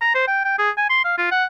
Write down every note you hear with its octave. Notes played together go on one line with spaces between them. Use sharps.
A#5
C5
G5
G5
G#4
G#5
C6
F5
F4
F#5